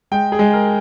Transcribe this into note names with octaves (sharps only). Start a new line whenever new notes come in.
G#3 G5
G#4
G#3
A#4